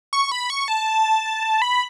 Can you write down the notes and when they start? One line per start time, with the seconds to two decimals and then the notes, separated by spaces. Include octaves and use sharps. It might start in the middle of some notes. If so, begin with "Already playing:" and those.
0.13 C#6
0.32 B5
0.50 C#6
0.68 A5
1.62 B5